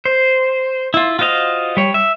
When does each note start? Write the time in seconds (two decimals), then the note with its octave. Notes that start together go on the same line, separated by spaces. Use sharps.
0.06 C5
0.94 E4 F4
1.19 F4 F#4 C5 D#5 F5
1.77 G3 C#5
1.94 E5